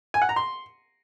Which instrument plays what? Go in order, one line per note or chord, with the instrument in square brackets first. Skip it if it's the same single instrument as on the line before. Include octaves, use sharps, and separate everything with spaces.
[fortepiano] G#5
F#5
A#5
C6